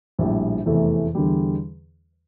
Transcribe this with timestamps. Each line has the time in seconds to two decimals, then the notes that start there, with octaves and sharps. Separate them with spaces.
0.18 A#1 A2 G3
0.66 F1 E2 C3 E3 A3
1.15 E2 D3 G3